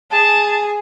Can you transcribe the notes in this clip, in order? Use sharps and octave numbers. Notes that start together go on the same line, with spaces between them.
G#4 A5